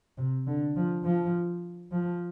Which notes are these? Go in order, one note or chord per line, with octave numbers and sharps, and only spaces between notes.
C3
D3
F3
F3
F3